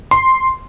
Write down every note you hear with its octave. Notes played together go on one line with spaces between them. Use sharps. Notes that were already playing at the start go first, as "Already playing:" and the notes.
C6